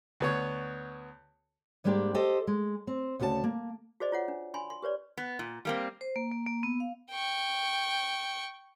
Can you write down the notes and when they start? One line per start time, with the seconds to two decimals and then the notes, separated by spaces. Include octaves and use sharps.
0.20 D2 B3 C#5
1.84 G#2 G3 G#3 A#3 D4 G4
2.14 G4 A4 C5 D#5
2.47 G#3
2.87 C4
3.19 D2 C#3 F#4 G#4 A5
3.44 A#3
4.00 F#4 G#4 C5 D5 D#5
4.12 F4 C#5 F#5
4.28 D4
4.54 D4 G#5 B5 C6
4.70 C6
4.82 G4 B4 C#5 D5
5.17 B3
5.39 A#2
5.65 G3 A#3 C4
6.01 C5
6.16 A#3
6.32 A#3
6.46 A#3
6.63 B3
6.80 F5
7.11 G5 C#6